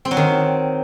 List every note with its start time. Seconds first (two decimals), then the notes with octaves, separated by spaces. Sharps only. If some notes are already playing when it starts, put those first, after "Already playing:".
0.05 C4
0.11 F#3
0.17 D#3